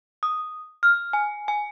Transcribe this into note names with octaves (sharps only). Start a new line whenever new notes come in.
D#6
F6
G#5
G#5